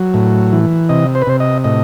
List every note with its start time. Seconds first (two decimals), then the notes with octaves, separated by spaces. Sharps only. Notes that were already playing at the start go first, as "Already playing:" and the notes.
Already playing: F#3
0.14 A2
0.53 E3
0.89 C3 D#5
1.15 C5
1.22 B4
1.27 C3 C5
1.40 D#5
1.64 A2 D#5